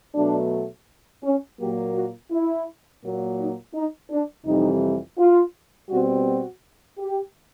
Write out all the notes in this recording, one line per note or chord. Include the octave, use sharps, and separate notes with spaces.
B2 F#3 A3 D4
C#4
A#2 F#3 A#3 G4
F#4
E4
A#2 F#3 A#3
D#4
D#4
D4
F2 C3 E3 G3 D#4
F4
B2 G3 C4 F#4
F#4
G4